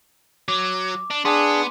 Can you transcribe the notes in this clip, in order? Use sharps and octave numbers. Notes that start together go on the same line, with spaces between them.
F#3 D6
D4
B3 D4 G#4 C6